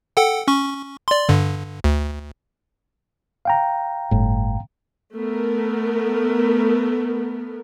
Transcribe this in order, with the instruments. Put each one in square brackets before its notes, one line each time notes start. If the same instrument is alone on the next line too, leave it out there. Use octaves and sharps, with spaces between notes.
[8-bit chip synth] A4 F#5 G5
C#4 C#6
D5 C6
G2 D3
D2
[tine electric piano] F5 G5 A#5
[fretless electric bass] G1 A2
[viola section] A3 B3 A#4